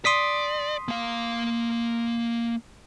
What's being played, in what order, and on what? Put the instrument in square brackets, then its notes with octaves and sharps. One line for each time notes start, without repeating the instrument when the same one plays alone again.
[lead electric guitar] D5 [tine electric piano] C6 D#6 B6
[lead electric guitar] A#3 F5